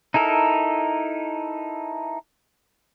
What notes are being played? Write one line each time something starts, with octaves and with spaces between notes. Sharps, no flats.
D#4 E4 A4 A#4